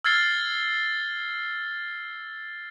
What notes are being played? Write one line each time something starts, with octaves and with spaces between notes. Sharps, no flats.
E6 F6 G#6 A6 C7 G7